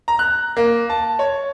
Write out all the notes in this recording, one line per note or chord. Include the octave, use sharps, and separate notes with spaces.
A#5
F#6
A#3
A5
C#5